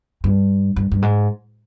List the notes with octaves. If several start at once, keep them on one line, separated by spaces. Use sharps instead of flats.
G2
G2
G2
G#2